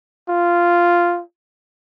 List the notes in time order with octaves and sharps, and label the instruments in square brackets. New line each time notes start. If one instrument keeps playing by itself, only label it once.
[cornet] F4